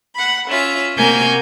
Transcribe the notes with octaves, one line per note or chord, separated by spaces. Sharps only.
F#5 B5
C#4 F4 E5
C3 A#3 F#4 G#5 A#5 G6